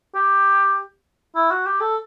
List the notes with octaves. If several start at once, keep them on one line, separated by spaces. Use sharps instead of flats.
G4
E4
F#4
G4
A4